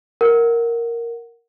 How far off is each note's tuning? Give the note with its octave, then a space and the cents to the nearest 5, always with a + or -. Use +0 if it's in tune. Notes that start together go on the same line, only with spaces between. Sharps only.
A#4 +0 F#5 +0